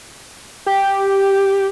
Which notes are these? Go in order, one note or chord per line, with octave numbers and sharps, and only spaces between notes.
G4